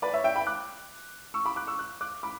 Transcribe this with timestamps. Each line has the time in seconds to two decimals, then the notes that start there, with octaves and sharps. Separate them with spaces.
0.02 B4 D5
0.14 C#5 E5
0.24 E5 G5
0.36 G5 B5
0.47 D6 F#6
1.34 C#6 E6
1.46 B5 D6
1.56 D6 F#6
1.67 C#6 E6
1.79 F#6
2.01 D6 F#6
2.23 B5 D6